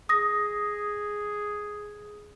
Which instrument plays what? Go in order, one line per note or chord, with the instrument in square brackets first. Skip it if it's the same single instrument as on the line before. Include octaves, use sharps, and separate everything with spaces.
[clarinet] G#4 [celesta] D#6 A#6